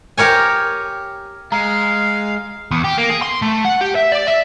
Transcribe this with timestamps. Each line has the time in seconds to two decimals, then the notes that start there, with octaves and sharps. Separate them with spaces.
0.17 G4 A#4 C#5 G#5
1.52 G#3 F5 A#5
2.71 E2
2.85 G4
2.98 A#3
3.10 G#4
3.22 C6
3.42 A3
3.65 F#5
3.81 G4
3.95 E5
4.12 D5
4.28 E5